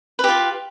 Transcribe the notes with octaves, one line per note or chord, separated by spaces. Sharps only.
F4 G4 B4